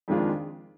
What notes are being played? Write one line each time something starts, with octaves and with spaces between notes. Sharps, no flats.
F2 D#3 G#3 D4 F4